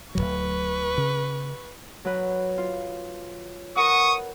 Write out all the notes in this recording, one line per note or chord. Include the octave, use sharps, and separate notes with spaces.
D1 C#2 F#3 B4 C#6
C#3
F#3 B4
F4
A#4 B4 F#5 C#6 D#6